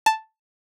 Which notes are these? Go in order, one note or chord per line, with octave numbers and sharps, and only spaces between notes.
A5